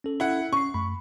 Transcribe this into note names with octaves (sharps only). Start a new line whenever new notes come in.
C#4 A4
E4 F#5
C#4 C#6 C7
F#2 A3 B5